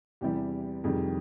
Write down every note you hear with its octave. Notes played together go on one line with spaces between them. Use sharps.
E2 C3 E3 G3 G4
F2 C3 D#3 G3 G#4